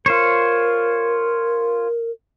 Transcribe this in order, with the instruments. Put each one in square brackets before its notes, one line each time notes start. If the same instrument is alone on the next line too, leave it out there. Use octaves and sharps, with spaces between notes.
[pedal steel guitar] F4 C5 C#5 [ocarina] A#4